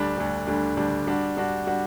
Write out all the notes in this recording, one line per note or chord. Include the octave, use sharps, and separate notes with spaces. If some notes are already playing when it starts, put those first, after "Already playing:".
Already playing: D2 D3 G3 D4
D2 D3 G3 D4
D2 D3 G3 D4
D2 D3 G3 D4
G3 D4 F#4
G3 D4 F#4
G3 D4 F#4